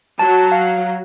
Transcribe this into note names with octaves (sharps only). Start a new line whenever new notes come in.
F#3 A5
F5